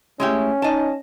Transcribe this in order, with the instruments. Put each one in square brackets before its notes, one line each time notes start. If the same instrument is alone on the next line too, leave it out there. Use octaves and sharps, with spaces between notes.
[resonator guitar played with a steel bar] G#3 E4 G4 [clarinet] A3 [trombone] C#4
[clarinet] D#4 [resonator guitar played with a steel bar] D#5 A5